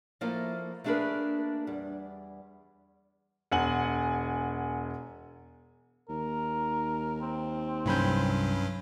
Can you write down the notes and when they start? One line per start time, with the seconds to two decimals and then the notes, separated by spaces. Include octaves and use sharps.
0.21 F3 A3 A#3 E4
0.84 A3 A#3 D4 G#4 A#4 B4
1.67 E2 G3
3.52 E1 F#5 G#5 F#7
6.09 D#2 A#4
7.21 C4
7.85 C2 G2 F#3 C#4 B5 G6